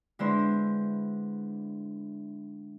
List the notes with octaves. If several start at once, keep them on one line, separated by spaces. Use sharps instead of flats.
D3 G#3 B3 E4 C5